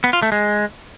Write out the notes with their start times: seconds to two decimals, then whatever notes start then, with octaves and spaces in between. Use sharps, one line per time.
0.04 B3
0.13 F4
0.22 A3
0.32 G#3